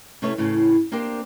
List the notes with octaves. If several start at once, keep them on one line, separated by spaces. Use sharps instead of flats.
C3 A3 C#4 E4 B4 C#5
E2 A2 C#3
A#3 C4 D4 G4 A#4 C5